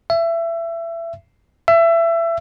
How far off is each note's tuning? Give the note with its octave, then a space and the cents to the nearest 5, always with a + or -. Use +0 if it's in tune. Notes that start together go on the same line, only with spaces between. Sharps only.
E5 +25
E5 +25